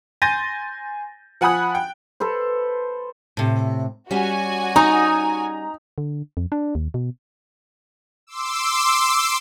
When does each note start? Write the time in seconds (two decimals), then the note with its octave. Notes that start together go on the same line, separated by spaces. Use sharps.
0.22 G#5 C6 G6 A6 A#6 D#7
1.41 F3 F#5 G#5 B5 D#6 F#6
1.75 G5
2.20 A4 B4 C5
3.37 A2 C3
4.11 G3 C#4 F#4 G#5
4.76 D#4 A#5
5.98 D3
6.37 F2
6.52 D4
6.75 D#2
6.94 B2
8.27 C6 D6 E6